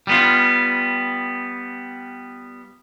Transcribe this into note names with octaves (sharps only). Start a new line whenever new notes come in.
G3 B3 F4